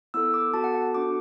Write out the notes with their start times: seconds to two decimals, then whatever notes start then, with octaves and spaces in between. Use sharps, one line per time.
0.14 B3 E4 A4 E6
0.34 D6
0.53 B3 F#4 A4 A5
0.64 F#5
0.75 F#5
0.94 B3 D4 F#4 A4 D6